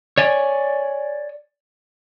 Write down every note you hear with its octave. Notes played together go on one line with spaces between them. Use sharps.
C#5 D5 G#5